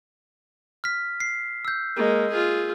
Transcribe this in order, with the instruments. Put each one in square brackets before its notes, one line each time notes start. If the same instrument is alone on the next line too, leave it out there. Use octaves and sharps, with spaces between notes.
[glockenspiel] F6 B6
C7
E6 G6
[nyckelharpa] G#3 A#3
F4 G#4